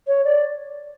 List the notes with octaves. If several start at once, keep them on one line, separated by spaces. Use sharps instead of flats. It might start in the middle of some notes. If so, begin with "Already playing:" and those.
C#5
D5